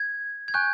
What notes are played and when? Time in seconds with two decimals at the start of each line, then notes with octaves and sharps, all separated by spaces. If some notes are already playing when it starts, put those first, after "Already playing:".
Already playing: G#6
0.48 G#6
0.54 G#5 C#6 F#6 G6